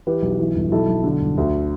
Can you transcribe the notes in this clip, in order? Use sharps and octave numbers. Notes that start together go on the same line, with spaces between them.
E3 G4 B4
B1
E3
G1
B1 E4 A4
B1
D3
G1
D2